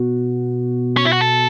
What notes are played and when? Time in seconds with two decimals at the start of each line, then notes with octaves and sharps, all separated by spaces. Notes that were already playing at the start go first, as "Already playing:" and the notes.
Already playing: B2 B3 F#4
0.97 C#4
1.05 E4
1.12 F#4
1.21 A4